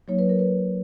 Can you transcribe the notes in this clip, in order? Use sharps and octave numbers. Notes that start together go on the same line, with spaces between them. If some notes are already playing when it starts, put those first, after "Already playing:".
F#3 A#3 D#4 C#5
B4
A#4
B4